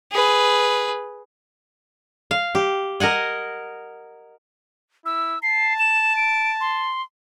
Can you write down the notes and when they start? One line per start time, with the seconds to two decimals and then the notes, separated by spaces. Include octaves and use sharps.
0.12 G#4 B4
2.31 F5
2.55 G4
3.00 A#4 D#5 F#5 G#5
5.06 E4 E6
5.43 A5 C7
5.79 E7
6.17 D7
6.61 C6